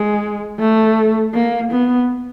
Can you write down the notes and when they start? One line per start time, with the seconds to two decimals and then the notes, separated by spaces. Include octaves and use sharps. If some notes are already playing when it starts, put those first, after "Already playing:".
Already playing: G#3
0.59 A3
1.34 A#3
1.72 B3